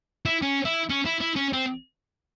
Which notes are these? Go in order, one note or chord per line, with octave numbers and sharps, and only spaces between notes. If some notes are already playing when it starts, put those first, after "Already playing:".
E4
C#4
E4
C#4
E4
E4
C#4
C4